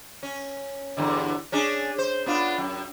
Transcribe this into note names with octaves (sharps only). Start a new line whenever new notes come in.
C#4
E2 G2 D3
C#4 D4 G#4
C5
B3 D4 F4
F#2